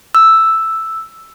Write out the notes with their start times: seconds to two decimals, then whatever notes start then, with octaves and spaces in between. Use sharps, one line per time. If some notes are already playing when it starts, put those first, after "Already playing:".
0.15 E6